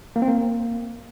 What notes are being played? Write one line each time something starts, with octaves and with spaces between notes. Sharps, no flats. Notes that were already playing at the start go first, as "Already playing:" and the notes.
A#3
C4
A#3